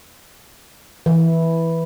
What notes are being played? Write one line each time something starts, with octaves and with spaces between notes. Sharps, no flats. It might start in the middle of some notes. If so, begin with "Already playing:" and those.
E3